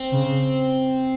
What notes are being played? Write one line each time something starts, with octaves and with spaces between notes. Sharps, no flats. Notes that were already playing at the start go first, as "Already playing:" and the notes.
Already playing: C4
C#3